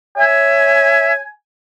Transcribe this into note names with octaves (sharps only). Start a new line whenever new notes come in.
C#5 E5 G#5